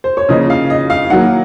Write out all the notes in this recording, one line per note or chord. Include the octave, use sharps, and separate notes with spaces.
C5
C#5
C#3 F3 A#3 D#5
F5
D#5
F5
D#3 F#3 A#3 F#5